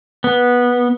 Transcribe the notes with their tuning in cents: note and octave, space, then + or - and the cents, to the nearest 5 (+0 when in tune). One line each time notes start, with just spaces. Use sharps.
B3 -10